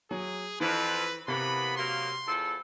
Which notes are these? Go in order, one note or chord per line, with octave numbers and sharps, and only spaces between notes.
F#3 G#4
F2 E3 B4
C3 E3 A#3 B3 B5
F#3 A#3 C6
E2 F3 A4